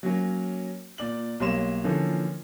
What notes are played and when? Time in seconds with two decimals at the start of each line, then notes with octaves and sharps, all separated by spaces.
0.03 F#3 A#3 C#4
0.98 A#2 D5 F#7
1.40 B1 G3 A#3 C#5 C6 E7
1.84 D3 E3 F3 A#3 C#4 A4